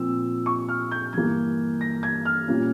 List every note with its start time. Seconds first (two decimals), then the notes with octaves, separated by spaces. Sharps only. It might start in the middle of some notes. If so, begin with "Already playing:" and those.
Already playing: A#2 F3 C4 E6
0.46 C#6
0.68 F6
0.91 G6
1.13 G2 E3 A#3 G#6
1.81 A#6
2.03 G#6
2.25 F6
2.48 A#2 G3 A#3 C#4